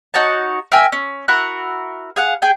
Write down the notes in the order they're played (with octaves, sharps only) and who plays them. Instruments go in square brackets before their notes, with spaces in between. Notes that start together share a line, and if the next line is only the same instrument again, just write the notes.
[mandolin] D#4 F#4 C#5 A5
A#4 E5 G5 G#5
C#4
E4 F#4 A#4 F#6
G#4 F5 F#5
G#4 G5 G#5